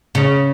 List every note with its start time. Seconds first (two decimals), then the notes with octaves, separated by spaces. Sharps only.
0.15 C#3